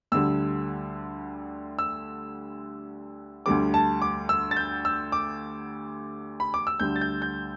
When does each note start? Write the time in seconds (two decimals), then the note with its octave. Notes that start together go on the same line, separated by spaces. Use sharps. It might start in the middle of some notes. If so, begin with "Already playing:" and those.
0.12 D2 D3 G3 E6
1.79 E6
3.46 D2 D3 G3 D6
3.74 A5
4.02 D6
4.29 E6
4.51 A6
4.57 G6
4.85 E6
5.12 D6
6.40 B5
6.54 D6
6.67 E6
6.80 D2 D3 G3 G6
6.96 A6
7.01 G6
7.22 G6